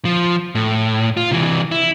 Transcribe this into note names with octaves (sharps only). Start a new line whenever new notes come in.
F3
A2
F4
C3 E3
E4